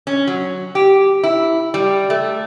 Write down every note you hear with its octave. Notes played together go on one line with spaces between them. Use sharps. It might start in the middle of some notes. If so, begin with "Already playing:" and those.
C#4
F#3
G4
E4
G3
A3